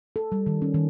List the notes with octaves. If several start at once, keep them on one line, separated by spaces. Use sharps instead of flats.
A4
G3
D#3
C#4
D#3